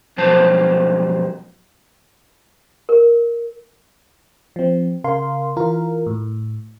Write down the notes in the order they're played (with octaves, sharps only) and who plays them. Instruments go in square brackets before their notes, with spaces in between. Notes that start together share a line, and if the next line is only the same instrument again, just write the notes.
[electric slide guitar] F#2 B2 F3 C5 A5
[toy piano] A#4
[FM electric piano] F3 C4
C#3 A#4 F5 C6
E3 F4 A#4
A2